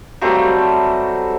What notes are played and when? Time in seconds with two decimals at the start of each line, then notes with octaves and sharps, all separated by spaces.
0.21 F#3 G3 A3 C4